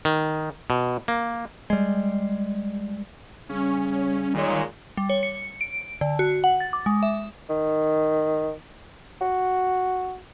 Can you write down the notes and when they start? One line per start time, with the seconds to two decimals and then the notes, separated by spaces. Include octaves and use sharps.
0.05 D#3
0.70 B2
1.08 A#3
1.70 G3 G#3
3.49 C#3 G3 C#4
4.34 A#2 D#3 G#3 C#5
4.97 G3
5.10 C#5
5.23 C#7
5.61 D7
6.01 D3
6.19 F#4
6.44 F#5
6.60 A6
6.73 D6
6.86 G#3
7.03 E5
7.50 D#3
9.21 F#4